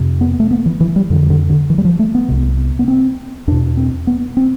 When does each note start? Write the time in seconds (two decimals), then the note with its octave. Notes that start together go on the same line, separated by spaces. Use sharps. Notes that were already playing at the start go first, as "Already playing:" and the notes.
Already playing: F2 C3
0.21 B3
0.40 A3
0.51 B3
0.66 E3
0.80 E3
0.96 G3
1.10 F2 D3 E3
1.30 D3
1.50 D3
1.70 E3
1.78 G3
1.85 F3
1.99 A3
2.15 B3
2.28 C2 C3
2.79 B3
2.88 C4
3.47 E2 B2 D4
3.77 C4
4.07 B3
4.37 C4